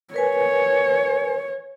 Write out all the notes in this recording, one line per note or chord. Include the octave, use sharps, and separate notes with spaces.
A#4 B4 C#5 G#5